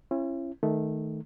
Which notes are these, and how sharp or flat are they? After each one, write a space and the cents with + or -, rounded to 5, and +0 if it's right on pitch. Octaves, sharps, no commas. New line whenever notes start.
C#4 -35 E4 +35
D#3 +0 A3 -15